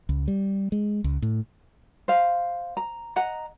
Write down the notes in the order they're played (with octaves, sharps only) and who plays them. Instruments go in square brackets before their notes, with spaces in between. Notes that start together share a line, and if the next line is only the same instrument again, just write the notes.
[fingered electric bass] C#2
G3
G#3
C#2
A2
[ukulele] C5 F5
A#5
D#5 F#5 A#5